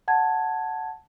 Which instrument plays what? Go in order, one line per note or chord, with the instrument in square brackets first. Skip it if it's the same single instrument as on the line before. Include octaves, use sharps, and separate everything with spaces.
[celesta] F#5 A5 G#6